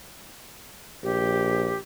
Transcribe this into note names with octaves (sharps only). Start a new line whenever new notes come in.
A#1 G4